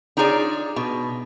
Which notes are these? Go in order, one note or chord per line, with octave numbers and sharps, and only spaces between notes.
D4 D#4 F4 G#4 C#5 D5
B2